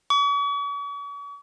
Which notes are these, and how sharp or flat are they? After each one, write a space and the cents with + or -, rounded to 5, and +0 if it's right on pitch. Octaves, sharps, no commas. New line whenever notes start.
C#6 +45